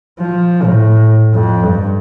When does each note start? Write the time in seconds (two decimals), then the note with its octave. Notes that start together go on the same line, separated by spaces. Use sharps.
0.20 F3
0.63 A2
1.34 F2
1.63 G2